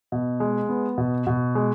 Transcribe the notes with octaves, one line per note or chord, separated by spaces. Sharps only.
B2
G#3
B3
B2
B2
G#3